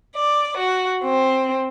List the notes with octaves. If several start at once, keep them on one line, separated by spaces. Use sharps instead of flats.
D5
F#4
C4